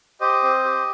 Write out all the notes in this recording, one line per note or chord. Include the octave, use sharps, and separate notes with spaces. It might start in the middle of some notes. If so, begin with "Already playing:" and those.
G4 C5 D#5
C4
G4